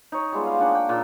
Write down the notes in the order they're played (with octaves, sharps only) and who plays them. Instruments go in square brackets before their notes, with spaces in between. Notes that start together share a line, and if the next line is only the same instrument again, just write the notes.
[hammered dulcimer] D#4 C#5
G3 G#3 B3 F4
F5
A#3 D4 F#5 G#5
G5
A#2 A#3 D#4